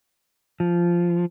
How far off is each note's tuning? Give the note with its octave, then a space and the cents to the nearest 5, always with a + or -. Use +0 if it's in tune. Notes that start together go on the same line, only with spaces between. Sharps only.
F3 -10